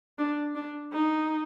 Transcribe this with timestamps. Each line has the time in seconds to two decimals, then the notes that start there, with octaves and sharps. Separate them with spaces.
0.19 D4
0.55 D4
0.93 D#4